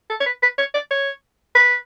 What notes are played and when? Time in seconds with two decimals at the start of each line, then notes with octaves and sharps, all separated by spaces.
0.10 A4
0.20 C#5
0.26 B4
0.42 B4
0.58 C#5
0.74 D5
0.91 C#5
1.55 B4